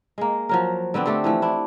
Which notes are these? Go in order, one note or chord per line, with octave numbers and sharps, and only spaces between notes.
G#3 A#3
F3 F#3 A#4
D3 B3 C4 D4
A3 G4 A4 C5
E3 F3 A3
D4 E4